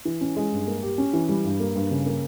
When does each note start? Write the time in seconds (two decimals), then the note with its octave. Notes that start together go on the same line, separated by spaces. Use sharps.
0.05 E3
0.21 C#4
0.36 G#3
0.52 G2
0.68 A#3
0.83 G4
0.98 C#4
1.13 E3
1.29 G3
1.44 G2
1.60 A#3
1.75 G2
1.91 C#3
2.06 A#3